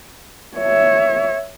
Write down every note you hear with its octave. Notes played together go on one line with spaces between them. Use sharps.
C#5 E5